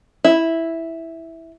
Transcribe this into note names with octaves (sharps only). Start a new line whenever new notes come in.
E4